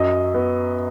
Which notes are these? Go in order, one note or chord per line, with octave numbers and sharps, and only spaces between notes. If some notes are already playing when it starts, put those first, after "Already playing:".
Already playing: F#2 F#3 D#5
B3